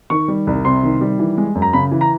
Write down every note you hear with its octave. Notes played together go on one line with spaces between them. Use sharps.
D#3 C#6
G3
C2
C3 C6
D#3
G3
E3
G#3
F#2
A#5
C#3 B5
E3
A#5